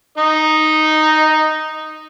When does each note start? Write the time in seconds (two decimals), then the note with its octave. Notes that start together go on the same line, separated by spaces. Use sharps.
0.18 D#4 D#5